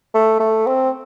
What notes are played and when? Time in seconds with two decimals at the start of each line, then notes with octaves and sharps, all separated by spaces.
0.14 A3
0.40 A3
0.67 C4